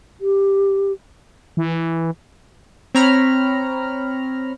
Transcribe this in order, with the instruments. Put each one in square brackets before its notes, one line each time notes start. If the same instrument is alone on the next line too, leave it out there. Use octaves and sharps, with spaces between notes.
[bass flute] G4
[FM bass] E3
[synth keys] C4 C#5 A#5 B5 F6